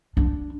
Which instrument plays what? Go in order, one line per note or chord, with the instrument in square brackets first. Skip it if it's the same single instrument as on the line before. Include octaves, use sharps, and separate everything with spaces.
[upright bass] D4